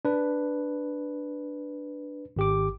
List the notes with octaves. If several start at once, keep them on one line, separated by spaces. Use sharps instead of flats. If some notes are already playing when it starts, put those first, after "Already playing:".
D4 B4
G#1 G4 D6